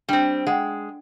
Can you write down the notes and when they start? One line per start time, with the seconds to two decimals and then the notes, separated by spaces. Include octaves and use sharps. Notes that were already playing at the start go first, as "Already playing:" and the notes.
0.09 G3 C4 D4 G5
0.47 G#3 F#5 G5